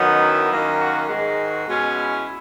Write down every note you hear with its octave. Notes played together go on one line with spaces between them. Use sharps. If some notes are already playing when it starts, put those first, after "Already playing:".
Already playing: F#2 D#3 F#3 B3 D#4
E4
F#2 D#3 A#3
F#4
G#2 D#3 G#3 F#4
B2 G#3 C#4
E4